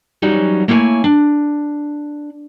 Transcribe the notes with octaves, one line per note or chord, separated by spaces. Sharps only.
E3 F#3 G3 C#4 D#4 F#4
A3 A#3 E4 C#5 G#5
D4